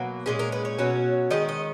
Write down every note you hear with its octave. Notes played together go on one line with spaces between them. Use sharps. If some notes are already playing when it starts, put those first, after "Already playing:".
Already playing: B2 F#3 A#3
A#2 G#3 C#4 G#4
A#4
B4
C#5
B2 F#3 C#4
D#3 G#3 C#4 D#5
D#5